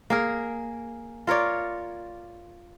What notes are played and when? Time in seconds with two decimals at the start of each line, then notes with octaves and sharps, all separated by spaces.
0.10 A#3 G#4 A#4
1.27 F4 A#4 C#5 D5